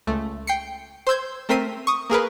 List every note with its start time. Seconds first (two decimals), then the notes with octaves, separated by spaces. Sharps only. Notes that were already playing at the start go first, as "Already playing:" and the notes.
0.07 C#2 A3
0.47 G5 C7 C#7
1.07 C5 C6 E6 G6 G#6
1.49 A3 C4 A#4 B6 C7 D#7
1.87 C#6 D#6
2.10 A#3 G#4 A#4 B4